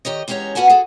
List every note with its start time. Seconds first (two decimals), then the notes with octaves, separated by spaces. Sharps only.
0.05 D#3 G4 C#5 D#5
0.28 E2 G#3 C#4 G4 C#5 A#5
0.55 B3 C#4 F#4 F#5 G#5 A5
0.69 F#4 G#4 A4